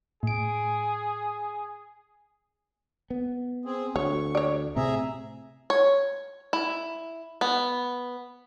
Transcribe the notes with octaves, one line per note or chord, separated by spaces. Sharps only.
A2 G#4 D7
B3
C4 G#4
D2 C#5 C#6
C#5 D5
A2 C3 C4 G#4 E5 A#5
C#5
E4
B3